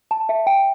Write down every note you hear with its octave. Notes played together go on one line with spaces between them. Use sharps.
A5
E5
G5